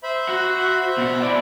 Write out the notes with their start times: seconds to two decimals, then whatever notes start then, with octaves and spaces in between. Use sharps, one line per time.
0.03 C5 E5 B5
0.29 F#4 F#5
0.98 B2 F#5
1.21 E4 D5